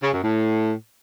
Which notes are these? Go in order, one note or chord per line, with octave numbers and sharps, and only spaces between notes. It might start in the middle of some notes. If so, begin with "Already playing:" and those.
C#3
F#2
A2